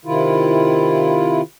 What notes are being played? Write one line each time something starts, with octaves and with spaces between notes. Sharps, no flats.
C3 D#3 E4 F4